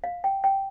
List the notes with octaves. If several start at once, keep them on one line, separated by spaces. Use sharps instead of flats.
F5
G5
G5